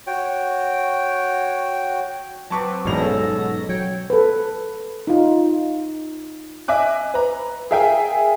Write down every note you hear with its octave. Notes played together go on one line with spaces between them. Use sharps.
F#4 C#5 G5
F#3 C4 B4 A5 C#6 D6
E1 A1 G#2 B2 F#3 G3 A#6 F7
C#4 A4
F#3 C#5 G5
A4 B4
D#4 F4
D#5 E5 G#5 D6 F#6
B4 A#5
G#4 A#4 E5 F5 G5 G#5